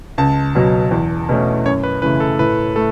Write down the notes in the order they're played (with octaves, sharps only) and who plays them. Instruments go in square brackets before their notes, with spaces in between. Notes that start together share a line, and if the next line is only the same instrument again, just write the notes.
[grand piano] C#2 [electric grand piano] A5
[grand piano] B2 F#3
E2
B2 A3 C#4
[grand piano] F#2 [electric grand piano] C#5
[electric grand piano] B4
[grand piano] C#3 E3 A3 E4 [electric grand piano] B4
[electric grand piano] A4
[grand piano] A2 [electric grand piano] B4
[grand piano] A3 [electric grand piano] A4